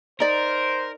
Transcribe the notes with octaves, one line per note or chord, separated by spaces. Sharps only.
D#4 A#4 C5 D5